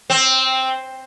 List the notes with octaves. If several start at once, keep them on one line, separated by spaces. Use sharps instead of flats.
C4